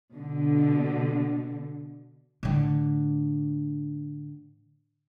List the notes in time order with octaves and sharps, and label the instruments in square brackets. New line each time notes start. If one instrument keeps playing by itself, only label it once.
[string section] B2 D3
[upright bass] A2 D3